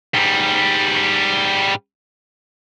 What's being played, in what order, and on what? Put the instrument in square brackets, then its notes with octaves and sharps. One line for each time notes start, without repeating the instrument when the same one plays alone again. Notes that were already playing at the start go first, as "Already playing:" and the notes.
[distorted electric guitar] G#2 G3